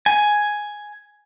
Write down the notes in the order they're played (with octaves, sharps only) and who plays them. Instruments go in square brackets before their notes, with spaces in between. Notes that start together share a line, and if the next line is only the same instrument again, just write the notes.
[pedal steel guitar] G#5